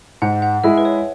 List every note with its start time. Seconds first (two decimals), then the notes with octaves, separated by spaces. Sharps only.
0.22 G#2 F#5
0.42 F#5
0.64 G#3 E4 G#4 E5
0.78 B4
0.85 C#5